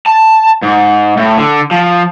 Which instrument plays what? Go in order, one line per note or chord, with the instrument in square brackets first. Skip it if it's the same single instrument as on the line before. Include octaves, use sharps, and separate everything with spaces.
[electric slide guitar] A5
G#2
A2
D3
F3